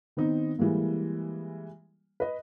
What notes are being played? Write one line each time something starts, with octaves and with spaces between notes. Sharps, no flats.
D#3 B3 C4 D#4
E3 G3 G#3 A#3
B4 D#5